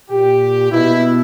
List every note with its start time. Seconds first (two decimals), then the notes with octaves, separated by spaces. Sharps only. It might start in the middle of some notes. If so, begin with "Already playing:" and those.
0.10 A#2 G4
0.72 B2 E4